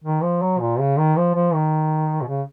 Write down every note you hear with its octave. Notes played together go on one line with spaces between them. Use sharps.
D#3
F3
F#3
A#2
C#3
D#3
F3
F3
D#3
B2
C#3